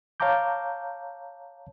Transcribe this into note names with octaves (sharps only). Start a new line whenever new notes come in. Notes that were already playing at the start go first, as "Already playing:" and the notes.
C#5 F5 A5 A#5 D6 G6